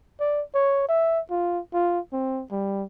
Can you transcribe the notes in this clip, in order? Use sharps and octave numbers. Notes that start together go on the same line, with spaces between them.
D5
C#5
E5
F4
F4
C4
G3